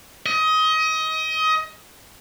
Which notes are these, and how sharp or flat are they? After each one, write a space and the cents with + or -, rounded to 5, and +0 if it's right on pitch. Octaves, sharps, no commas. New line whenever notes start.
D#5 +25